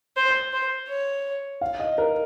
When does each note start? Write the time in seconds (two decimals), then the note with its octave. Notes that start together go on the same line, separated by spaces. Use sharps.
0.16 C5
0.53 C5
0.89 C#5
1.61 F5
1.80 D#5
1.98 A#4